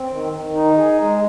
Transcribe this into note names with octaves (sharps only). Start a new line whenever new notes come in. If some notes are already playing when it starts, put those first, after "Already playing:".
Already playing: C4
D#3
D#3
D#4
G#4
G#3